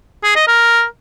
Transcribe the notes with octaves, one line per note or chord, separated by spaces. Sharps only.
G#4
D#5
A#4